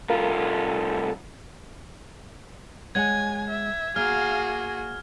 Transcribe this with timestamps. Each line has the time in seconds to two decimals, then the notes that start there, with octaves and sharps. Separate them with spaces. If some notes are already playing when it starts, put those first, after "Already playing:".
0.10 C2 F4 A4 A#4 F5
2.95 G#3 C#5 F#5 G#5 G#6
3.50 E5
3.96 A#3 F#4 G#4 F5 F6